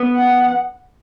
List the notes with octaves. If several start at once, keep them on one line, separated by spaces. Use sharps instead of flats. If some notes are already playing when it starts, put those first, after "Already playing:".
Already playing: B3
F#5